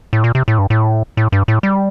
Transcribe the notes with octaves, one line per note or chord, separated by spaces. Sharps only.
A2
A#2
C3
A2
G2
A2
A2
G2
A2
G3